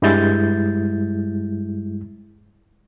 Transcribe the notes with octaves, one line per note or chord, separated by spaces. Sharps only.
G2 G3 G#3 E4 G6 A6